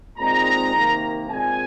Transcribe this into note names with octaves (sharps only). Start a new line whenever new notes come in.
A#2 G#3 C4 D#4 A#5
C3 D#3 A#3
A#2 G#3 C4 G#5